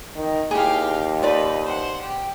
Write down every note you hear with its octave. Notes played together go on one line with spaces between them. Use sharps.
D#3
D#2 E4 G4 G#4 F5
D#4 F4 B4 D5
C5 F#5
G4